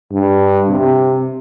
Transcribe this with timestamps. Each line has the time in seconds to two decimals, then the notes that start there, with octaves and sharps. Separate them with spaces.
0.12 G2
0.69 C3